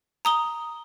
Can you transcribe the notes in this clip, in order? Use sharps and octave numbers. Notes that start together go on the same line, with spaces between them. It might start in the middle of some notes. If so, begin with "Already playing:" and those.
A#5 D#6 G7